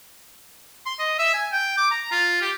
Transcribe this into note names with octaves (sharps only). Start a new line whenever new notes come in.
C6
D#5
E5
G#5
G5
D6
A#5
F4
G4